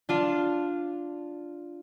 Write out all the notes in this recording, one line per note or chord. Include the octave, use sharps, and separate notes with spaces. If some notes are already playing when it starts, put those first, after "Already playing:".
D4 F4 F5